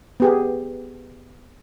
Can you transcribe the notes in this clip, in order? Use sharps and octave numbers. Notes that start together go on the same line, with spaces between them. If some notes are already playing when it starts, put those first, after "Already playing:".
B3 G4 G#4